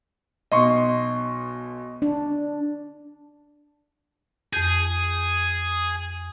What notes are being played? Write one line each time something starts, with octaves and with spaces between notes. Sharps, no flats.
B1 B2 D#5 C6 C#6
D4
F2 G#4 G6